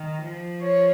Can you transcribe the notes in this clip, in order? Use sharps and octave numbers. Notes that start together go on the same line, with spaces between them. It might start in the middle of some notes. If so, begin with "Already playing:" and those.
Already playing: D#3
F3
C#5